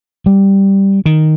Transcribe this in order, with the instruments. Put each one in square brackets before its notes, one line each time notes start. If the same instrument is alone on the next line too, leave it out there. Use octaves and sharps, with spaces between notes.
[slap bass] G3
D#3